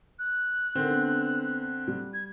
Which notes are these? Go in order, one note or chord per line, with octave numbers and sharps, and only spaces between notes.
F#6
D3 D#3 C4 A#4
B3 D4
G3
G#6